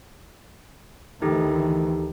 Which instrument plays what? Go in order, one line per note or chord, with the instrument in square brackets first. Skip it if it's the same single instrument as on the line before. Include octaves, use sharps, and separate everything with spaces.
[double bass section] D2 D#3 E3 [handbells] D#4 G4 A4